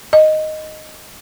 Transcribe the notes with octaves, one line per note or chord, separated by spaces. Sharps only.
D#5